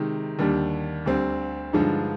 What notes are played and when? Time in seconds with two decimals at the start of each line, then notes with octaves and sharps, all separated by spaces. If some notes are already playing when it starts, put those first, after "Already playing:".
Already playing: C3 D#3 G#3 D#4
0.39 D#2 D3 G3 D4
1.06 D2 D3 G3 C4
1.73 G2 D3 F3 G#3 D#4